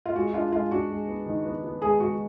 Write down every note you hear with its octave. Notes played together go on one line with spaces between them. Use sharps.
F4
G#3 F#4
D4 F4
G#3 F4
D4 F#4
G#3
B3
D#3
B3
B3
G#3 G#4
G#3 F#4